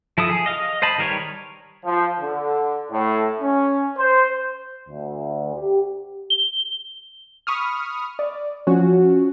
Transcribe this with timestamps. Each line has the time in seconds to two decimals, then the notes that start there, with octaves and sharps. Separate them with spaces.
0.18 F3 E4 A4 D#6
0.30 G#4
0.46 D#5 F5
0.82 C5 D#5 A5 B5
0.98 D#3 G3 A#4 B4 C#5
1.84 F3
2.20 D3
2.90 A2
3.41 C#4
3.97 C5
4.89 D2
5.54 G4
6.30 G7
7.47 B5 C#6 D#6 F6
8.19 D5
8.67 F3 C#4 F#4